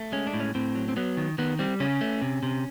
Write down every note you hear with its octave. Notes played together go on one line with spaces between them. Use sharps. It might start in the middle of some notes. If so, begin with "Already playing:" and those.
Already playing: A3
G#3 C#4
D4
A2
C#4
A2 C4
F#3
C4
F#3 B3
D#3
D#3 B3
G3 C4
C#3 C#4
A3
C3
C3